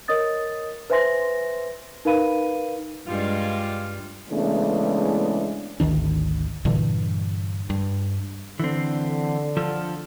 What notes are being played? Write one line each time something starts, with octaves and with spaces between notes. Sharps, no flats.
A#4 C#5 D#5 D#6 A6
B4 C5 E5 G#5 C6 A#6
D#4 A#4 B4 F5 B5 D#7
G2 G3 G#3 F4
C#3 E3 G#3 A3 B3 D4
G#1 D2 D#3 D4
G2 A#2 D3 E3
G2
D3 E3 C4
F3 F4 A4